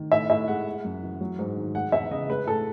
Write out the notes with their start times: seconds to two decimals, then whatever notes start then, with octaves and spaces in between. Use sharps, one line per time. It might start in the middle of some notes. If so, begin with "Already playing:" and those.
Already playing: D#3
0.12 A2 E5
0.30 A2 E5
0.48 G#3 F#5
0.66 G#3
0.84 F#2
1.03 E3
1.21 F#3
1.39 G#2
1.57 D#3
1.75 G#3 F#5
1.92 E2 E5
2.11 C#3 D#5
2.29 G#3 B4
2.47 A2 A4